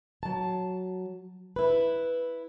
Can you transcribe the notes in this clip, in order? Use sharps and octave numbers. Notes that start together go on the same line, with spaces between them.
F#3 A5
E4 B4